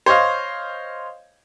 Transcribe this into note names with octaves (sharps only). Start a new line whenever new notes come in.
C5 C#5 D#5 F5